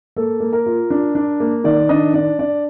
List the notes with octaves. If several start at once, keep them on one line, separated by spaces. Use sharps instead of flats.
A#3 A4
A#3
A#4
F4
D4
D4
A#3
D#3 D5
D4 D#5
D4 D5
D4 D5